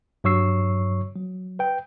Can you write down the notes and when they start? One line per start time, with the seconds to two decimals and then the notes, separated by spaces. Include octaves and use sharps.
0.24 G2 F#3 C#5 C#6 E6 C7
1.16 F#3
1.59 B4 G5